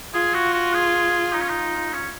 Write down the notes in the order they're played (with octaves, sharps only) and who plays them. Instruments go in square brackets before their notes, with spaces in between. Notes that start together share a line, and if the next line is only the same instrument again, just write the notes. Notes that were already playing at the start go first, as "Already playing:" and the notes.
[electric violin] F4 [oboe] G#4
[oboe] F#4
F#4
G#4
D#4
C#4
D#4
C#4